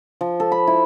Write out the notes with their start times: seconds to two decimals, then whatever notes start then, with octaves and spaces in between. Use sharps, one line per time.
0.21 F3
0.40 A4
0.52 B5
0.67 E4